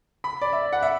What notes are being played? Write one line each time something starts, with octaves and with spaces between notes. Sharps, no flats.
B5
D5
E5
F#5
E5